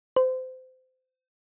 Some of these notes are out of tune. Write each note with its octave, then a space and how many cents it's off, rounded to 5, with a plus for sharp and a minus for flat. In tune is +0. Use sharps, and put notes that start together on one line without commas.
C5 -25